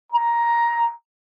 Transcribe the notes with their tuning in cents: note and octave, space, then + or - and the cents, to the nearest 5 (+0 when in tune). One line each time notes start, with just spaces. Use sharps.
A#5 +10